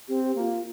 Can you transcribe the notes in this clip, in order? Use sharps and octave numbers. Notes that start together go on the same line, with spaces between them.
C4 G4
A#3 F4 G4